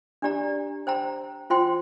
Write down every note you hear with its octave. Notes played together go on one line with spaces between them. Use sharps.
D4 G4 D5 A#5
C5 G5 A#5
F4 C5 G5 C6